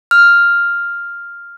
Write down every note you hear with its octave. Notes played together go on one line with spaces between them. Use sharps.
F6